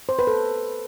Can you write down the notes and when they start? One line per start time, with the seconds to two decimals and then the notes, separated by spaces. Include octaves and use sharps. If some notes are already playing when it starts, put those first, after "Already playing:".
0.09 C5
0.19 B4
0.27 A4